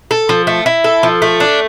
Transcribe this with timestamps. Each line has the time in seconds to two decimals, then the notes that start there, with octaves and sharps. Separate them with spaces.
0.11 A4
0.29 F3
0.47 A3
0.66 E4
0.84 A4
1.03 F3
1.22 A3
1.40 D4